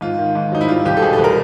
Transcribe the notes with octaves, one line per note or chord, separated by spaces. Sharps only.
G#2 F4
D#3
G#2
F#3 D#4
E4
G3 F4
C2 G4
A4
B2 G#4
A4
C2
A#4